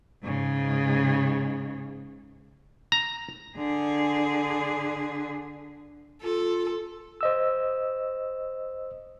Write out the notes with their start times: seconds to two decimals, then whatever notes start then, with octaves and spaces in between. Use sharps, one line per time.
0.23 G#2 C#3
2.92 A#5
3.57 D3 G#4
6.23 F4 A4
7.21 C5 D#5 E6